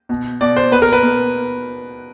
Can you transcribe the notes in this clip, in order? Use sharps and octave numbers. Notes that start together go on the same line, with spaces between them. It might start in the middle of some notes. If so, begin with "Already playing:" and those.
B2
B2 D5
C5
B2 B4
A#4
B4
B2